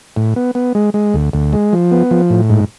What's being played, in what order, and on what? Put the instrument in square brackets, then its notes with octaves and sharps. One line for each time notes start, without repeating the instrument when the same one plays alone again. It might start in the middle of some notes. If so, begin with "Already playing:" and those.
[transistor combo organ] A2
B3
B3
G#3
G#3
D2
D2
G#3
F3
B3
F3
A2
G#2